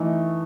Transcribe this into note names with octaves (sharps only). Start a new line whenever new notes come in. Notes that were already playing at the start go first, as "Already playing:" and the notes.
Already playing: E3 A3 D#4